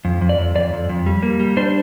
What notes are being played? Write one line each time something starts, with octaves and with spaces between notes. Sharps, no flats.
F2
F2
D5
F2
F2 D5
F2
F2
G3
A#3
G3
D4 C5